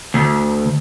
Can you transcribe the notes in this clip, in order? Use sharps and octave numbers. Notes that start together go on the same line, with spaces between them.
D2